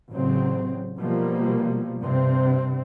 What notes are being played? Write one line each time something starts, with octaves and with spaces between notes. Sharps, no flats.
A1 C#3 F#3 C4
B2 F3 G3 A#3
G2 C3 C4